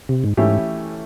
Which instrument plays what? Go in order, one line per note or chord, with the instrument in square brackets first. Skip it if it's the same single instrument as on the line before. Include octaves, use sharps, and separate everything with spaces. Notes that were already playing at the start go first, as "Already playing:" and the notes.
[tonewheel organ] C3
G#2
[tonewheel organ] G#2 [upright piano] E3 A3 C#4 E4 G4